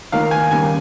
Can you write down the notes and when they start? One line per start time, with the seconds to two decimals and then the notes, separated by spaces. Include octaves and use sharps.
0.12 D#2 D#3 A#3 F4 F5
0.31 G#5
0.51 D#2 C#3 G3 A#3 G#5